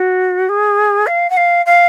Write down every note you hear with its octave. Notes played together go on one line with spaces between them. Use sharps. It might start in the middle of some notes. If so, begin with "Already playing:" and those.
Already playing: F#4
G#4
F5
F#5
F5
F5